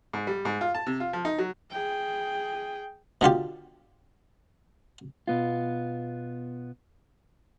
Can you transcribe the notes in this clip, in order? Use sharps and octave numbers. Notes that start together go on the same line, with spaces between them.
G#2
G3
G#2
F4
A5
C3
F4
F3
D#4
F#3
G#4 G5
B2 D3 F4 G4
B2 B3 F4